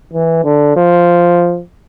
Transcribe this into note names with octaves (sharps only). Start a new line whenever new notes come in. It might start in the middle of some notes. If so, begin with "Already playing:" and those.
E3
D3
F3